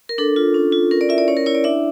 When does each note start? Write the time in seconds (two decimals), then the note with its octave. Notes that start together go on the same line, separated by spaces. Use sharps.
0.09 A#4
0.18 D4 A4
0.36 F4
0.54 C#4
0.72 F4
0.91 C#4 A#4
1.01 D5
1.09 E4 E5
1.18 D5
1.28 C#4 C#5
1.37 A#4
1.46 E4 C#5
1.55 D5
1.64 D4 E5